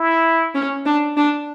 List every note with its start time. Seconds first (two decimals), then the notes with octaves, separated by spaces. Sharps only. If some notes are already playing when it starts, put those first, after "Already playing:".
Already playing: E4
0.55 C#4
0.86 D4
1.17 D4